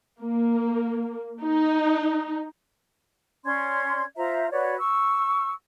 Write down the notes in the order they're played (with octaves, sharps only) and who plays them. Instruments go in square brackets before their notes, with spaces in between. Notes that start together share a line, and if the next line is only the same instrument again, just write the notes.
[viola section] A#3
D#4
[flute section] C#4 D5 C6 G#6
F4 C5 E5 A#5
F#4 B4 C#5 D5
C#6 E6